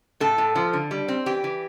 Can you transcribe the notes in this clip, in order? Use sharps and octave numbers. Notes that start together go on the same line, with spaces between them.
A2 A4
A2
F3
D3
G3
C4
E3 G4
E3